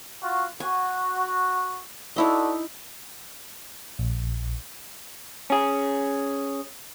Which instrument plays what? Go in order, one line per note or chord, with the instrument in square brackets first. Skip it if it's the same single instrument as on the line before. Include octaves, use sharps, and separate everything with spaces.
[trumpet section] F4 F#4
[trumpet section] F#4 [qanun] G#5
[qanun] D#4 E4 D#5 [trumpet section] F#4 A4 D5
[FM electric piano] A#1
[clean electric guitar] C#4 G#4